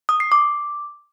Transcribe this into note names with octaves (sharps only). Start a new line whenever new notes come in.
D#6
C7
D6